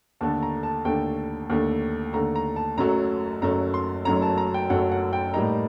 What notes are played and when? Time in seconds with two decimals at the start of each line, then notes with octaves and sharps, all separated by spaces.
0.21 D#2 D3 A3 A5
0.42 A#5
0.63 A5
0.85 D#2 D3 A3 G5
1.50 D#2 D3 A3
2.13 D#2 D3 A3 A#5
2.35 A#5
2.56 A5
2.78 F#1 F#2 F#3 A3 A#5
3.42 F#1 F#2 F#3 A3 A#5
3.74 C6
4.05 F#1 F#2 F#3 A3 A#5
4.22 A5
4.38 A#5
4.54 G5
4.70 F#1 F#2 F#3 A3 F#5
4.91 F#5
5.13 G5
5.34 A2 G3 A#3 D#4 A#5